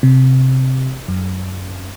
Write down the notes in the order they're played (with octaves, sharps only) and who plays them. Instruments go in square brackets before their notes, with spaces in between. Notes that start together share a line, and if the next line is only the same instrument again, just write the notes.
[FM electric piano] C3
F#2